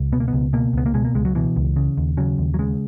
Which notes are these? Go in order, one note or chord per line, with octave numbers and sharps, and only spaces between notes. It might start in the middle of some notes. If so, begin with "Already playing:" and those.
Already playing: C#2
B2 B3
A#3
C#2 B3
B2 A#3
C#2 B3
A#3
B2 G#3
A#3
C#2 G#3
F#3
B2 E3
C#2
C#3
D#2
C#3 F#3
D#2
F#3
C#3 G#3